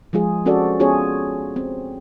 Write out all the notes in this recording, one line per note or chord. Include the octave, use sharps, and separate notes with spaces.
F3 G#3 F4 G#4
C4 C#4 F#4 A4 C5 D5
B3 C#4 F4 G#4 C#5
C4